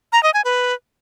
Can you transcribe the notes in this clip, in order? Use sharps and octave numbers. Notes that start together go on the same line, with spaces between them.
A#5
D#5
G#5
B4